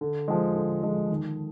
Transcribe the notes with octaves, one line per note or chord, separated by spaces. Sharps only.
D3
F3 G#3
D3
F3 G#3
D#3